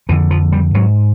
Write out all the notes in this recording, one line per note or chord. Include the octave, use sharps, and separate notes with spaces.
F2 D3 E3
F3
G3
G#2 F#3